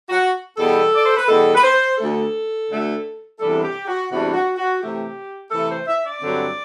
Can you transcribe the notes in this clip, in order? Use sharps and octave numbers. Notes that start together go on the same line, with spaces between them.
F#4
E2 B2 G3 B3 A4
D5
C5
B4
E2 B2 G3 B3 A4
B4
C5
D2 D3 A3 A4
D2 D3 A3
E2 C3 E3 G3 D4 A4
G4
F#4
E2 C3 E3 G3 D4 F#4
F#4
F#4
C3 E3 A3 G4
C3 E3 A3 A4
C5
E5
D5
G2 D3 F#3 C4